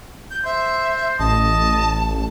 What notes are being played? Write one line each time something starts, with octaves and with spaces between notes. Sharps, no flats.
G6
C5 E5
A1 D#5 A5